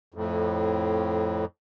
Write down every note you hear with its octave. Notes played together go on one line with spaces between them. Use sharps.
F2 A2